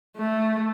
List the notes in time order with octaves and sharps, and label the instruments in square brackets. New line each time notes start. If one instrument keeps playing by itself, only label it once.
[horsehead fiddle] A3